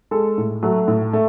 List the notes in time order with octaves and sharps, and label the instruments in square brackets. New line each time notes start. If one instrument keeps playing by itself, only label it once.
[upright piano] G#3 A4
A2
F#3 A3
A2
A3